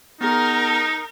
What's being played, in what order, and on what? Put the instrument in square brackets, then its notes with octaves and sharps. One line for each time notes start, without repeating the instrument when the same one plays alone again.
[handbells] B3 G#4 [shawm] D#4 [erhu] A#4